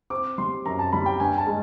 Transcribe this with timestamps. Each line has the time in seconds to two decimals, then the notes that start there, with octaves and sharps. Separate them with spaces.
0.10 C4 D6
0.38 G3 C6
0.66 F#2 A#5
0.79 A5
0.93 G3 B5
1.06 G5
1.20 G2 G#5
1.38 A5
1.47 G#3